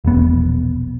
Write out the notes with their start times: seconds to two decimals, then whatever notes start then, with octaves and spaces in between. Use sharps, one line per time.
0.05 E1 A#1 B3